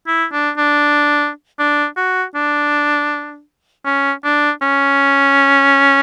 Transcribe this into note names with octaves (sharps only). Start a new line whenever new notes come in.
E4
D4
D4
D4
F#4
D4
C#4
D4
C#4